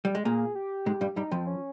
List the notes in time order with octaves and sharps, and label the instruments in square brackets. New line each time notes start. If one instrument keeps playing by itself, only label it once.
[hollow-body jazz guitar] G3
G#3
[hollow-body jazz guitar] A#2 A#3 [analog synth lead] G#4
[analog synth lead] G4
[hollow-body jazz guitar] G#2 G#3
G2 G3
[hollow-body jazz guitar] G2 G3 [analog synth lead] D#4
[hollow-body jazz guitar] F2 F3 [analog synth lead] C4
[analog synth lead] C#4